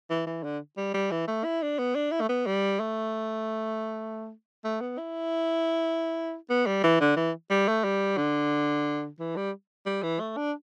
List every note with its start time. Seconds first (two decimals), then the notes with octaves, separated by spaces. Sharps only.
0.10 E3
0.27 E3
0.43 D3
0.77 G3
0.94 G3
1.11 E3
1.28 A3
1.44 E4
1.62 D4
1.79 B3
1.95 D4
2.12 E4
2.21 A3
2.29 B3
2.46 G3
2.80 A3
4.65 A3
4.81 B3
4.98 E4
6.50 B3
6.67 G3
6.84 E3
7.01 D3
7.16 E3
7.50 G3
7.68 A3
7.84 G3
8.18 D3
9.19 E3
9.36 G3
9.86 G3
10.03 E3
10.20 A3
10.37 D4